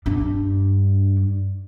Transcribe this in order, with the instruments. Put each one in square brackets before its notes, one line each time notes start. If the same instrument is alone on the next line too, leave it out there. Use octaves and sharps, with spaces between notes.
[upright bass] G2 D4